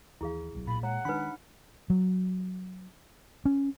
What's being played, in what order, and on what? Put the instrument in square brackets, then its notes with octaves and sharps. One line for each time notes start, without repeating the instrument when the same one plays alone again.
[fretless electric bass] D#2 E3 [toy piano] E4 G#4 F5
[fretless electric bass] D1 B1 F#3
[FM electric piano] A#2 [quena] B5
[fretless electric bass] G#3 [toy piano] C#5 A#5 [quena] F#5
[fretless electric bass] D#3 G#3 [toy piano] D4 D#4 B4 [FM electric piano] B5
[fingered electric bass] F#3
C#4